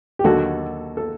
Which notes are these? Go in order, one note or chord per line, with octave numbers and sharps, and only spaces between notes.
G4
D#2 D3 F#3 F#4 A4
A4